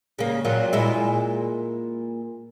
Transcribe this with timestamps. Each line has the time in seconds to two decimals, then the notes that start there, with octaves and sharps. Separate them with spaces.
0.19 C#3 A#3
0.45 A#2 F#3 F4
0.73 A#2 G#3 E4